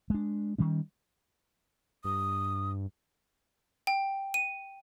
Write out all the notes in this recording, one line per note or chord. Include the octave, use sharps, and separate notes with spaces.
G#3 D4
D#3 G3 C#4
G2 D#6
G5
D#7